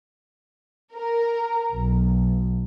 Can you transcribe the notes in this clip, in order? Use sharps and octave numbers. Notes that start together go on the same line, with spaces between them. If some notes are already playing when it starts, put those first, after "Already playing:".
A#4
B1